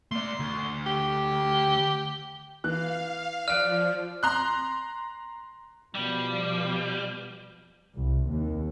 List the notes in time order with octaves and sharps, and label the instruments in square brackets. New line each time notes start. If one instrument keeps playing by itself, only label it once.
[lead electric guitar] A3 D5 [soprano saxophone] C6
[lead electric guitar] D2
[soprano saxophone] G4
[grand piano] E3 F#6 [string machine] F5
[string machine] F3 [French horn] D5 [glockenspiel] F6 [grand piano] F#6 D7 D#7
[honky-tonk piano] A#5 C6 F#6
[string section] B2 F3 [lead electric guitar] G3
[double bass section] C2
D#2